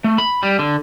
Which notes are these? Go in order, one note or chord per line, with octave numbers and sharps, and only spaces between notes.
A3
B5
G3
D3